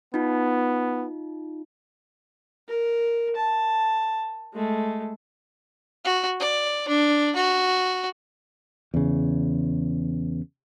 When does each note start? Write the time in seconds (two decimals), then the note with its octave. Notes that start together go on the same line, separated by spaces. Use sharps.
0.14 B3 D#4 F4
2.68 A#4
3.36 A5
4.53 G#3 A3
6.04 F#4
6.39 D5
6.88 D4
7.36 F#4
8.94 E2 C#3